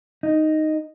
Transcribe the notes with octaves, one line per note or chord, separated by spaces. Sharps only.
D#4